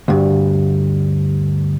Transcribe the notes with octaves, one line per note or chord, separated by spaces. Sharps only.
D2 G2